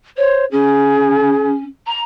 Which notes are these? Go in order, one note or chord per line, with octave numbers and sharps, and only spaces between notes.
C5 C#5
C#4 G#4
A#5